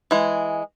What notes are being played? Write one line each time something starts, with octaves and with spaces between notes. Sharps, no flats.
E3 G#3